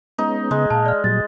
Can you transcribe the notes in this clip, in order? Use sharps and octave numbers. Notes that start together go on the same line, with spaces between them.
G#3 B3 C#4 D#4
C#3 G#3 B3
A#2 F5 A5
D5 F6
A#2 F#3 G3 A6